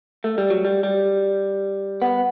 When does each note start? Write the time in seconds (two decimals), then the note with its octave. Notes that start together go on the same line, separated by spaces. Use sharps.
0.24 A3
0.38 G3
0.50 F#3
0.65 G3
0.83 G3
2.02 B3